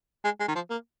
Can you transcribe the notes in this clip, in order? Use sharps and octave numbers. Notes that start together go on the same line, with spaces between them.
G#3
G#3
D#3
F3
A#3